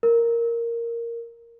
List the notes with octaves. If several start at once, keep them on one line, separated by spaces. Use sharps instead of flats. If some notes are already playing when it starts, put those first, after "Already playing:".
A#4